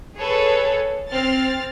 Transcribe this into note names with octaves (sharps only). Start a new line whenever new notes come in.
G#4 A4 B4 C#5
C4 F6 A6